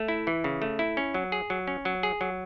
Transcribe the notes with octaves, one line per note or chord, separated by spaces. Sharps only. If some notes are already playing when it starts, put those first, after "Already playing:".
Already playing: A3
E4
E3
C#3
A3
E4
C#4
F#3
G#4
F#3
C#4
F#3
G#4
F#3